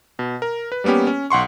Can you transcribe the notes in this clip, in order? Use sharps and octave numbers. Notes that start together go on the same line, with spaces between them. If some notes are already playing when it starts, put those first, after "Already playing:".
B2
A#4
B4
G3 A#3 B3 C#4 G4
C#4
B1 F#5 C6 C#6